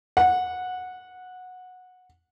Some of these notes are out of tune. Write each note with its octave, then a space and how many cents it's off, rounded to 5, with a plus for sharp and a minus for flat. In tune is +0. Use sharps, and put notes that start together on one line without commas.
F#5 -15